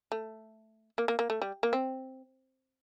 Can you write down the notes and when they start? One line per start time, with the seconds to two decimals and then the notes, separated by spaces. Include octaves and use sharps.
0.12 A3
0.98 A#3
1.08 A#3
1.19 A#3
1.30 A3
1.42 G3
1.63 A#3
1.73 C4